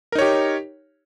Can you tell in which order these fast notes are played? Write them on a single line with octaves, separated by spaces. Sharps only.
A#4 D#4 C#5 G4